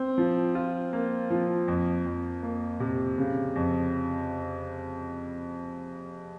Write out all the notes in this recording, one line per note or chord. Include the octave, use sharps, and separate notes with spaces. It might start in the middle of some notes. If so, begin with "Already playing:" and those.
Already playing: C4
F3
F4
A#3
F3
F2
F2
A#3
C3
C#3
F2